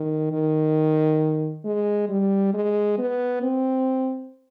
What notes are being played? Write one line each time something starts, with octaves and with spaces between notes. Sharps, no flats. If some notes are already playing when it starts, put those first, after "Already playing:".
Already playing: D#3
D#3
G#3
G3
G#3
B3
C4